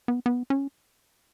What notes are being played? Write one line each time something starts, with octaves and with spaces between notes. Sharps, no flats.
B3
B3
C#4